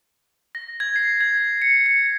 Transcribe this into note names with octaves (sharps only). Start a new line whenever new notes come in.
A#6
G#6
C7
G#6
C#7
C#7